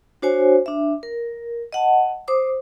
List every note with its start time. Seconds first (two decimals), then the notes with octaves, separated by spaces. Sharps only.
0.22 D4 F#4 C5 C#5 G#5
0.66 D4 E5
1.03 A#4
1.73 D#5 F#5 A5
2.28 C5 D6 D#6